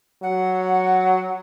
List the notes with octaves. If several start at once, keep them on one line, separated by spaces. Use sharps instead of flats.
F#3 F#5